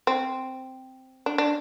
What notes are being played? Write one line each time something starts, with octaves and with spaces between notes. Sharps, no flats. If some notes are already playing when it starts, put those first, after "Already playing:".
C4
D4
D4